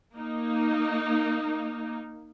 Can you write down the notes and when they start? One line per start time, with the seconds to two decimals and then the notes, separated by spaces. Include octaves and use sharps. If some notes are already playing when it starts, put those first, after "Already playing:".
0.18 A#3 D#4